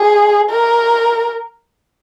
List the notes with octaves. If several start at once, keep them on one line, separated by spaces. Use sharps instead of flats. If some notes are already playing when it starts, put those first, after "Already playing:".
Already playing: G#4
A#4